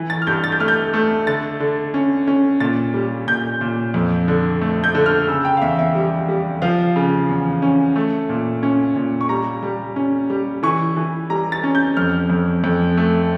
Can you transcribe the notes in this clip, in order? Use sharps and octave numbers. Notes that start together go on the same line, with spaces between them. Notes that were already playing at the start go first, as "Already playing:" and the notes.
Already playing: E3
A6
F6
G2 G6
A6
G6
A3 F6
G6
A3
D3 A6
D3
C#4
C#4
A#2 A6
G3
A#2 G6
A#2
F2
D3
A3
G6
D3
F6
C#3 E6
G5
F5
E2 E5
E5
G3
G3
F3 F5
C#3
E2
C#4
A3
A#2
C#4
A#2
C#6
G3 A#5
G3
C#4
G3
E3 C#6
E3
G3 A#5
A6
C#4
G6
F2 F6
F2
F2
A3